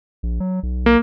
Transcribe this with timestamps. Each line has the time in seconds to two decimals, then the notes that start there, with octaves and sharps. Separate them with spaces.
0.23 A#1
0.40 F#3
0.63 B1
0.86 A#3